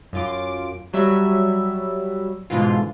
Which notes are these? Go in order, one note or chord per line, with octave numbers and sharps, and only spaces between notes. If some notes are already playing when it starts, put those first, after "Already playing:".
F#2 F4 D6
F#3 G3 E5
G#2 B2 D3 E3 F4